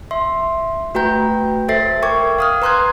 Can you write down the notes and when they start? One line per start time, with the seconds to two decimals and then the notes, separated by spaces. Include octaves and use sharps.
0.11 E5 C6
0.95 A3 F#4 B4 G5 A#5 G6
1.68 A4 C5 E5 A6 C7
2.02 A#4 G5 C#6 D6 G#6
2.39 F5 D#6 F6
2.62 B4 A#5 C6 D#6 F#6 G#6